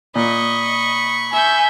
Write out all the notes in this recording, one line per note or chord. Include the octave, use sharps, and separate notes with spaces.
A#2 D#5 B5 C#6
E5 G#5 G6